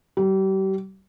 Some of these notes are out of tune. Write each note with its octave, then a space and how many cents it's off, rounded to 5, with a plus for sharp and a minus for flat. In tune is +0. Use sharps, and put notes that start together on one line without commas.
G3 -35